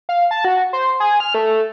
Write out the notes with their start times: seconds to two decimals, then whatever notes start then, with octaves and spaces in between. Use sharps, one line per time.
0.09 F5
0.31 A5
0.45 F#4
0.73 C5
1.00 G#4
1.20 F6
1.34 A3